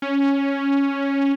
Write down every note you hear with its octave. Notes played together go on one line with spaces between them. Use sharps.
C#4